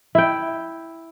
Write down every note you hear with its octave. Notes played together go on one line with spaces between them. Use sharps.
E4 G5